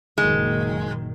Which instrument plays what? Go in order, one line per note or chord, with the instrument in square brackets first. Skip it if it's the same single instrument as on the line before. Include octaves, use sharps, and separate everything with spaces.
[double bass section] F#1 A#2 D#3 [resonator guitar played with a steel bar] G#3